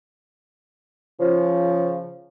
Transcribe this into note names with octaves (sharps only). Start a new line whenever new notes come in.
C#3 F3